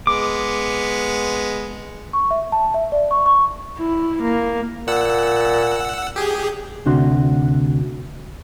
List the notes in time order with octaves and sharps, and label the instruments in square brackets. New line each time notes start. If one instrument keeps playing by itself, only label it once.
[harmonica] G#3 B3 [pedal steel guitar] D6
[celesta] C#6
E5
A5
E5
D5
C#6
C#6
[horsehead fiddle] E4
A#3
[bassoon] A#2 [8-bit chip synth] F#5 E6
[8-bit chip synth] G4 G#4
[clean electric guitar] D2 C3 D4 F#4 C6